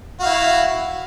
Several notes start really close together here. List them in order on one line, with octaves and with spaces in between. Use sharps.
F#4 F5 E4